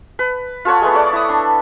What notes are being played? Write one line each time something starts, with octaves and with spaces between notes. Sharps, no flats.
B4
F4 A4 C#5 F#5
G#3 A3 B3
A4 C#5 D5 F#5
E4 D#6
D4